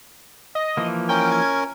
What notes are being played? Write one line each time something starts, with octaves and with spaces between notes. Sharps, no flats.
D#5
E3 F3 A#3
C#4 A#4 G5
G#6